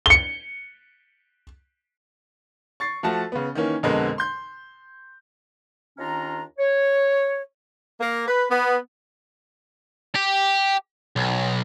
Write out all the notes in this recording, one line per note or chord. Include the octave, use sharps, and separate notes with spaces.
C#7 G7
C#6 A6 C7
F3 A3 F#4 A5
C#3 B3
D#3 E3 A#3 C#4
F2 B2 D3 G#3 C4 A#4
C6 G6
D#2 D#3 C#4 D4 F4 A#5
C#5
A#3
B4
B3
G4
B1